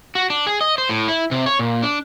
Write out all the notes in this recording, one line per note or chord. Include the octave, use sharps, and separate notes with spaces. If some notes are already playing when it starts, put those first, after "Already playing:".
F#4
D4
G#4
D#5
C5
A2
E4
C3
C#5
A#2
D4